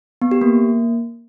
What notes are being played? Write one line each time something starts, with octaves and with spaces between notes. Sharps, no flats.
B3
G4
A#3